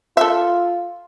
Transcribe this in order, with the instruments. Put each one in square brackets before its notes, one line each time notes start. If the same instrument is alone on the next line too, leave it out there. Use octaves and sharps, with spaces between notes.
[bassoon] F4 [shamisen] A4 E5